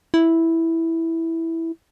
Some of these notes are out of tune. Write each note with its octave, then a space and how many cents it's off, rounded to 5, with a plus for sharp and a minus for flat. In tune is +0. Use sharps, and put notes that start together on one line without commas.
E4 -5